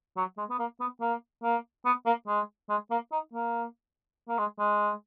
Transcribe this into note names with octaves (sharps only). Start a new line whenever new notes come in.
F#3
G#3
B3
A#3
B3
A#3
A#3
B3
A#3
G#3
G#3
A#3
D#4
A#3
A#3
G#3
G#3